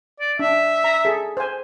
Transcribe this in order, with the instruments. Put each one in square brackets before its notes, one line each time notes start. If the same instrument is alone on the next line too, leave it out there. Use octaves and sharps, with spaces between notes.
[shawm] D5
[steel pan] D4 [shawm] E5
[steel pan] A#5
G#4 A4
C5 G#5